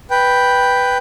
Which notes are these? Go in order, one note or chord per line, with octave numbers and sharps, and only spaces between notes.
B4 G5